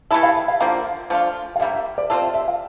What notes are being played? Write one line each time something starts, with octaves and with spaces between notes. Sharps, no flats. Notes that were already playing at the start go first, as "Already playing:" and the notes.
E3 A3 E4 A4 E5
F5
E5
F5
D3 F3 A#3 F5
F3 A3 D4 F4
F5
D3 G3 A#3 E5
E5
D5
C4 F4 A4 D5
E5
E5
F5